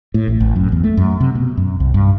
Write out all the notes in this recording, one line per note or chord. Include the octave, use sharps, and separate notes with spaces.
A2
A1
A1
F#2
E2
A3
F#2
C3
B2
F#2
C2
G2